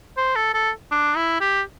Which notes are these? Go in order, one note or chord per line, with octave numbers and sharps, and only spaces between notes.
C5
A4
A4
D4
E4
G4